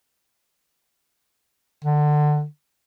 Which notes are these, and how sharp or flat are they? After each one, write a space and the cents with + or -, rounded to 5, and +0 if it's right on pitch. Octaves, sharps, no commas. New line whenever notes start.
D3 +25